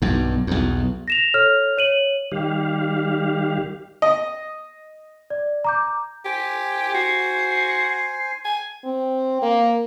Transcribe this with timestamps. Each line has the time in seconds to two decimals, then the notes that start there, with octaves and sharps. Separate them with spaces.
0.02 B1 G2
0.47 B1 E2
1.08 A#6 E7 F7
1.34 A4 C#5 F6 F7
1.78 C#5 D#7 F#7
2.32 D#3 G3 G4 F5
4.02 D#5
5.30 D5
5.64 A#5 D6 G6
6.25 G4 C5 G#5
6.94 F#4 C7
8.45 G#5
8.84 C4
9.42 A#3